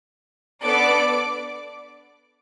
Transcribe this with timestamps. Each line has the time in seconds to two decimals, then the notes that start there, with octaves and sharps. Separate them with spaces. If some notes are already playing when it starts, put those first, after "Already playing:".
0.64 B3 D4 A4 D5 D6